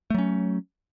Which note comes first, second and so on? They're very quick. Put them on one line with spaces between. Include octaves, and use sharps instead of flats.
A3 F#3 C#4